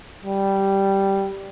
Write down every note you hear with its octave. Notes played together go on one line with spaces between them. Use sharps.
G3